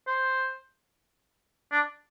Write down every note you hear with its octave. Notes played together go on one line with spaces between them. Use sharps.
C5
D4